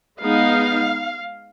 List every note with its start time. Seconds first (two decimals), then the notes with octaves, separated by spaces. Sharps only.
0.21 G#3 B3 D#4 F5